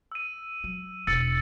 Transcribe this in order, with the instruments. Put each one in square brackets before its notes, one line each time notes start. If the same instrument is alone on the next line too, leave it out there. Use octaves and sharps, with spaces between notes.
[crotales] E6 D#7
[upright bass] F#3
[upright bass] E1 [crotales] E6 A6 C#7